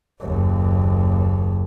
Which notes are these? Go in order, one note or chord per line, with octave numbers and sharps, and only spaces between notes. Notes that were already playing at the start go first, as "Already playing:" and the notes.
F#1 D#2